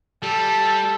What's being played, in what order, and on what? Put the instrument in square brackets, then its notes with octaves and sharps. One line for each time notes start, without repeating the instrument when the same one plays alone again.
[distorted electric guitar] G3 [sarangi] A4